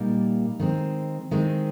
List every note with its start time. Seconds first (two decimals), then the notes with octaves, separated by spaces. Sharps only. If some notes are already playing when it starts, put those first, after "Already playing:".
Already playing: A#2 G3 A#3 D#4
0.59 D#3 G#3 C4
1.31 D#3 G#3 C4